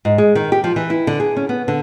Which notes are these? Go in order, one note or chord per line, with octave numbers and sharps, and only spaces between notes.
G#2
G#3
D#3
G4
F3
E3
E4
D3
G#4
C#4
B3
D3